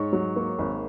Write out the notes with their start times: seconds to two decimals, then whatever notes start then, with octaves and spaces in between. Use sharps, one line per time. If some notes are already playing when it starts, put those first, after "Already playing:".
Already playing: G#2 C#5
0.13 F#3
0.36 A#3
0.59 G#1